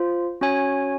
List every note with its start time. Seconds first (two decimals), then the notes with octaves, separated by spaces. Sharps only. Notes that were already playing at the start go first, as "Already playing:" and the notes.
Already playing: F4 C5
0.41 C#4 F#4 C#5 G#5